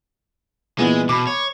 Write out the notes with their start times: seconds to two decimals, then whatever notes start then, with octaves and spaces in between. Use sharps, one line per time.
0.79 A#2 E3 G#3 B3
1.09 B2 B5 D6
1.27 C#5